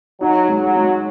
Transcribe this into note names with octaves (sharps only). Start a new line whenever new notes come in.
F#3 D#4
G#3
F#3
G#3